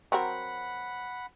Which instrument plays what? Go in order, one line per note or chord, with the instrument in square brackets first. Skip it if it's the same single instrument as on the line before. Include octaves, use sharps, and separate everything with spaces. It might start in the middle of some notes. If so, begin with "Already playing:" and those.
[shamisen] F#3 C4 A#4 [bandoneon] F#5 B5